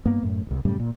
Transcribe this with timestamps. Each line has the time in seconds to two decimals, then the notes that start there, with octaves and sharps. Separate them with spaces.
0.05 G2 A#3 B3
0.23 F#2 A2
0.47 D#1 C2
0.65 F#2 A2 C#3 G3
0.80 A#2